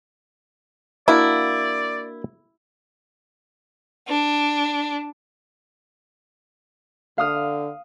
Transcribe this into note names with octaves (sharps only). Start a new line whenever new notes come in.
A#3 D4 E4 F#4 D5
D4
D3 F5 D#6 F6